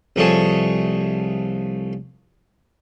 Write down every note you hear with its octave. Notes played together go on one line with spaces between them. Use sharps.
C2 F3 A3 G#4 C#5 A5